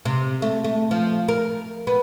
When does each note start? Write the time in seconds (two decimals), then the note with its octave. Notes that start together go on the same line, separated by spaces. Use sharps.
0.05 C3
0.42 A3
0.64 A3
0.91 F3
1.28 A#4
1.87 B3